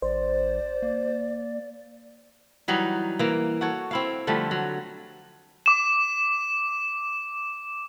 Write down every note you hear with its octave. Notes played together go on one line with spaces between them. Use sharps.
A1 C5 D5
A#3
E3 F#3 G3 D#4
E3 A#3
F#4 A4 C#5
C4 E4 F5
D3 F3 G3 A3
F#3
D6 E7